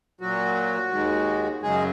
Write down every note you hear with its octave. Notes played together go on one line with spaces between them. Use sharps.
A#2 F#3 F#4
D#2 D#3 G#3
F#2 C#3 F#3 G#3 G#4